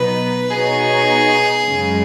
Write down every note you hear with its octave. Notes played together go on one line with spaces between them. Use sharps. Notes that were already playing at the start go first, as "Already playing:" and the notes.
Already playing: B2 F#3 B3 D#4 B4
B2 B3 D#4 F#4 G#4 C#5
F#2 C#3 G#3